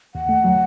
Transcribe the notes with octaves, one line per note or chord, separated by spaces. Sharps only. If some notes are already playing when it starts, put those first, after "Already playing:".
D#2 F#5
A3
F#3